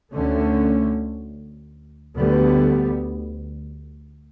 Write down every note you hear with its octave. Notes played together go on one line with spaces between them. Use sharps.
D2 D3 A3 C#4
D2 D3 G3 B3